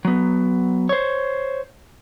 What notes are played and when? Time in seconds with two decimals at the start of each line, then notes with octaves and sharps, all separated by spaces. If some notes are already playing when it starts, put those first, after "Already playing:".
0.05 F#3 B3
0.89 C5 C#5